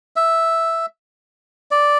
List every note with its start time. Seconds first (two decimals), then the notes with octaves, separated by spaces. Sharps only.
0.16 E5
1.71 D5